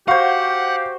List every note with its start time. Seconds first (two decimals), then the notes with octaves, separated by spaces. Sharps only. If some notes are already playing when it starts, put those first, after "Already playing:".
0.08 F#4 G4 C5 F5 F#5